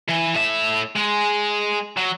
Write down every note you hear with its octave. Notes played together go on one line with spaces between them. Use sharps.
E3
A2 E5
G#3
F#3